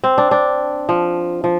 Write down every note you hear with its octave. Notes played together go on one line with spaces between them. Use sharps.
C4
D4
D4
F3
F3